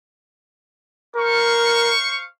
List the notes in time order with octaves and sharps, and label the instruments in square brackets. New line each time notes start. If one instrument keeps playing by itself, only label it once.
[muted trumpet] A#4 [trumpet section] C5 F5 C#6